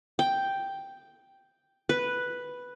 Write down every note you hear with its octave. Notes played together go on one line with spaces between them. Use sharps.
G5
B4